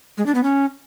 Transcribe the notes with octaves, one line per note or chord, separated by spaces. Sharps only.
G#3
D4
B3
C#4